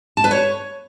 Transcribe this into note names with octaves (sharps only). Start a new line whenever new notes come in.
A5
B4
C#5